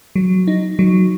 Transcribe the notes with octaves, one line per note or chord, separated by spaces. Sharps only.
F#3
D#4
F#3